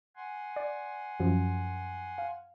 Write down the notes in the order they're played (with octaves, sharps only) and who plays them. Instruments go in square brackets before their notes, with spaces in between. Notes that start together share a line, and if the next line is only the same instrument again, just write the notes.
[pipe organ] F#5 G#5 C6
[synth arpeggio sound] D5
F#2 F3
F5